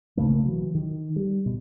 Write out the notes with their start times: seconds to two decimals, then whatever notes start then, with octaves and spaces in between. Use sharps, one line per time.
0.17 B1 C#3 A3 A#3
0.45 E3 F#3
0.75 D#3
1.16 G3
1.46 B2